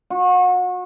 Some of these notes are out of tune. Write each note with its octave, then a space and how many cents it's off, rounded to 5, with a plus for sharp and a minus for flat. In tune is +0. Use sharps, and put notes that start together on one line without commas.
F#4 -35